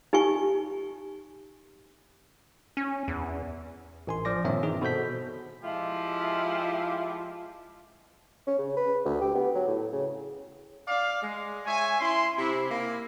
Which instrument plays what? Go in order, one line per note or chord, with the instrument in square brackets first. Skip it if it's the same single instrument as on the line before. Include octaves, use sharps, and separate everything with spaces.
[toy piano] D#4 G4 G#5 C#6
[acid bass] C#4
E2
[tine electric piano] A1 G#5 C6
F3 D5 D6 A#6
G2 A#2 D#3 C4 C#5 E5
E3 D#4 G#4
B2 A4 C5 G6 B6
[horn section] F3 G#3 E4 F4 G4
[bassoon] C#4
C#3
B4
D2
G4
B3
F#3
A2
C#3
[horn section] D5 F5
G#3
C#5 E5 G#5
C#4 E4 C6
C3 E4
A#3 E4